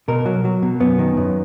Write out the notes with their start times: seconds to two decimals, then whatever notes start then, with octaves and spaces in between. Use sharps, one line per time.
0.08 B2 A#4
0.26 F#3
0.45 F#3
0.62 B2
0.80 F#2 B3
0.99 D#3
1.17 F#2